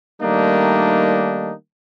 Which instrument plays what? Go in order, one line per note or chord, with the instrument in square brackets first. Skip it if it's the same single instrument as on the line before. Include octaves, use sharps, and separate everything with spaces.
[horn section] D#3 G3 A3 A#3 D4 D#4